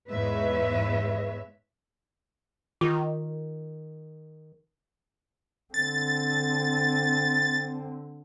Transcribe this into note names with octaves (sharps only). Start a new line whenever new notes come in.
E2 G#2 G#3 B4 C#5 E5
D#3 F4
D3 C4 A6